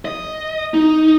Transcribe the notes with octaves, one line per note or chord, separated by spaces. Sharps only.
D#5
D#4